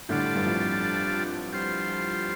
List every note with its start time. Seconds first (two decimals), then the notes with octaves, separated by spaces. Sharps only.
0.09 A2 D3 G3 D4 F4 A4 D5
0.35 G2
0.45 F2 A2
1.52 G3 F4 C5